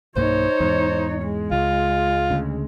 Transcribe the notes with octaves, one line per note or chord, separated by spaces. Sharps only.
B1 G2 A#3 D#4 C5 C#5
E2 G#2
G#3
C#2 F4
D2 C#3